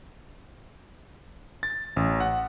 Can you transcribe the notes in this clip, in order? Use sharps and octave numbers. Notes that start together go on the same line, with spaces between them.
A6
A1
F#5